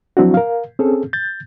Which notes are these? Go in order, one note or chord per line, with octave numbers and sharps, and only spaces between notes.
F3 F#3 C4 D4 E4 F#4
A#4 F5
C4 C#4 G#4 A4
G6 A6